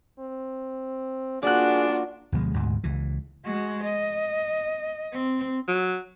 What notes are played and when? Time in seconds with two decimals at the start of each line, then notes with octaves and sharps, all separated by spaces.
0.20 C4
1.43 A#3 D4 F4 F#4 G#4 D5 F#6
2.32 D2 B2 F3 G#3
2.54 D2 G#2 B2
2.84 C#2 E3
3.45 G#3 F#4
3.84 D#5
5.12 C4
5.68 F#3